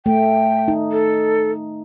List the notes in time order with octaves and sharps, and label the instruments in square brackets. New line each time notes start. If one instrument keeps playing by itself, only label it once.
[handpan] A3 [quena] G5
[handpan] D#4
[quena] A4